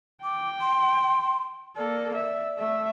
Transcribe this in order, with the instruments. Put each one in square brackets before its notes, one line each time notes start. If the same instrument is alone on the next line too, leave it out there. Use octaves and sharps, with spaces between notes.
[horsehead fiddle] G5 [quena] D6
[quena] C6
[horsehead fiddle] A#3 A4 [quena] D5
[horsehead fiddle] E5
A3 E5